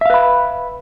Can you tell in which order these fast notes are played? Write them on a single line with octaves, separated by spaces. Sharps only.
E5 F5 B4 B5